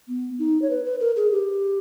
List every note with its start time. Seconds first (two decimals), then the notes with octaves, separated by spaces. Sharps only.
0.09 B3
0.39 D#4
0.62 C#5
0.70 B4
0.85 B4
1.00 A#4
1.16 G#4
1.32 G4